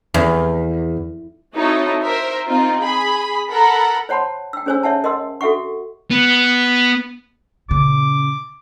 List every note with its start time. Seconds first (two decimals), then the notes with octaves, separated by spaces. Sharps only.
0.14 E2
1.55 C4 D#4 E4 F#4 A4 C#5
2.04 A#4 C5 E5
2.46 C4 D#4 F4
2.80 G#4 B5
3.50 A4 A#4 F#5 A#5 B5
4.09 C5 C#5 F#5 A5 B5 C6
4.53 G5 E6
4.66 C#4 G#4 C5 C#5 G#5 E6
4.83 C#5 E5 F#5 A5
5.04 A#4 D#5 F#5 C6 E6
5.41 F#4 A4 E5 F#5 C#6
6.11 B3
7.69 A#2 C#3 D6